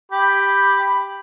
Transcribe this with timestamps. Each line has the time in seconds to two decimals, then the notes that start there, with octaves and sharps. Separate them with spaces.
0.12 G4 B5